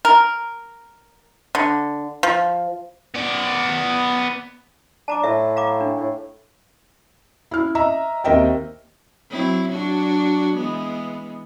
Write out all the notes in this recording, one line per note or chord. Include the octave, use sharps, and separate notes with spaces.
A#4
D3
F3
B3 D5
D4 A5 A#5 D6
A2 E5
F5 A#5 D6
D4
A2
E4 F6
D#5 E5 A#5 E6
D#2 C4 A#4 D#5 E5 G5
F#3 C4 E4
F#3 D4 F#4
E3 G#3 B3